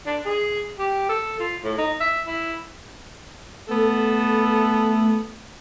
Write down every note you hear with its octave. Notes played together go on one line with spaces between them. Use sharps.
D4
G#4
G4
A4
F4
A2
D#4
E5
E4
A3 B3 A4